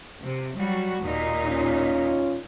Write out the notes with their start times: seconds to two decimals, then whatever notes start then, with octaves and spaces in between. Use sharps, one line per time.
0.21 C3
0.57 F#3 G3 F#4
1.02 D#2 A#2 D#4
1.48 C#4 F4